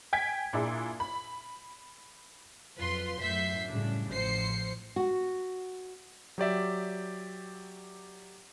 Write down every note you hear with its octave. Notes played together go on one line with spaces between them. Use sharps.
G5 G#5 G#6 B6
A#2 D4 E4 G#4
B5
F2 F#3 F4 B4 C6
F#2 A2 E5 G6 B6 C7
A2 C#3 G3 D4
A1 F3 C5 C7 C#7
F#4
F#3 G4 D5 E5